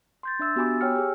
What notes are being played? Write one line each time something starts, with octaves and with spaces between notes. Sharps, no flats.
C6 G6 A6
D4 E5 E6 A6
B3 F#4 G4 G#5 B5 D6
C#5 G5 G#5 E6 F6 C#7
G4 G#4